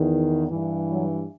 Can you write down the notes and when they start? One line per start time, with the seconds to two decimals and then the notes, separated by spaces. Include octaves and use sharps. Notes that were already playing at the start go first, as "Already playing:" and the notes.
Already playing: E2 D#3
0.48 G2 E3
0.89 F#3